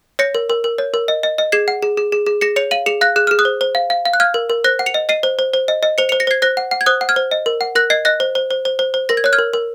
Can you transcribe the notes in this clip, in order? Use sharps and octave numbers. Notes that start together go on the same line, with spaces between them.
C#5 A#6 C#7
A#4
A#4
A#4
C#5
A#4
D#5
D#5
D#5
G#4 G#6 C7
F#5
G#4
G#4
G#4
G#4
G#4 A#6 C#7
C#5 C#7 F7
F5 D#7 F#7
G#4 C#7 F7
F5 F#6 A#6
G#4 F#6
G#4 F6
D#6 F#6
C5
C5
F5
F5
F5
F#6
F5 F6 G#6
A#4
A#4
C5 F#6 A#6
F#5
C#7 F7
D#5
D#5 C7 D#7
C5
C5
C5
D#5
D#5
C5 C#7 F7
C#7 F7
C5
A#6 C#7
C5 G#6 C7
C5 F#6 A#6
F#5
F#5
G#6
C5 D#6 F#6
F#5
F6 G#6
C5
D#5
A#4
F#5
A#4 F#6 A#6
D#5 G#6 C7
D#5 F#6 A#6
C5
C5
C5
C5
C5
C5
A#4 A#6
G#6
C#5 F#6
F6 G#6
A#4
A#4